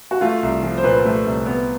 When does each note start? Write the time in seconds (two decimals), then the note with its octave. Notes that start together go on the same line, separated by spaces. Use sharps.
0.11 F#4
0.21 A3 F4
0.43 C2
0.63 F3
0.78 C5
0.84 A#2 B4
1.05 A3
1.26 C2
1.46 B3